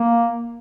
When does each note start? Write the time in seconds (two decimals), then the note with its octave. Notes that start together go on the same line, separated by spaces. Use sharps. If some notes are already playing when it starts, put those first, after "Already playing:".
Already playing: A#3